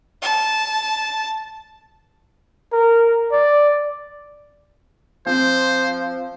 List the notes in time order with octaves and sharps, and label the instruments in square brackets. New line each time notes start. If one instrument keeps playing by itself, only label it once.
[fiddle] A5
[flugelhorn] A#4
D5
[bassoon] F3 [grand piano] C4 [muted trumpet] C5